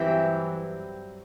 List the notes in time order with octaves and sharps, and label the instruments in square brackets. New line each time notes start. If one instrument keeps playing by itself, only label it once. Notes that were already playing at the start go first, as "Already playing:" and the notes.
Already playing: [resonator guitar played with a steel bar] G2 F#3 C4 E4 G4 [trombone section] E3